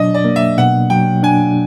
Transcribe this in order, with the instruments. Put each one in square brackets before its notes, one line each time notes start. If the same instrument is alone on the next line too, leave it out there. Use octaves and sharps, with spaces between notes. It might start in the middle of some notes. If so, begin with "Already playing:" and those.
Already playing: [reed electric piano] B2 F#3 D4 [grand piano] D5 D#5
[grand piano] D5
[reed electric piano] A#3
[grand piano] E5
[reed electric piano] B2 [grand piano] F#5
[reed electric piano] F#3 [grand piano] G5
[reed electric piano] D4 [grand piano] G#5